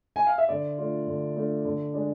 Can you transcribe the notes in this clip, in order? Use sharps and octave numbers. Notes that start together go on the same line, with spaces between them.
G#5
F5
E5
D3 D5
A3 D4 F4
D3
A3 D4 F4
D3
G#3 D4